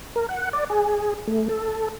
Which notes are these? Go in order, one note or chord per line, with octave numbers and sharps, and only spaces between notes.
A#4
F#5
D5
G#4
A3
A4